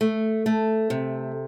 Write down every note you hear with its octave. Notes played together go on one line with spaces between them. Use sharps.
A3
A3
C3